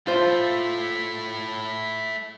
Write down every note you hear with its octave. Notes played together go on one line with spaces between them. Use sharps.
A3 E4 F4 C5